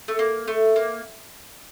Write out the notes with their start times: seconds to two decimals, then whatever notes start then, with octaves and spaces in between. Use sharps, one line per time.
0.08 A3
0.19 A#3
0.47 A3
0.76 A#3